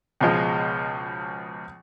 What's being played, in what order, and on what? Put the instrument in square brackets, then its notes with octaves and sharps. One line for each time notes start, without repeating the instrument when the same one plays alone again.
[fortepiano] C#2 B2 F3 G#3